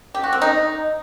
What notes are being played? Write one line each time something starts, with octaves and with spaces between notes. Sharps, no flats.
G4
F#4
C4
D#4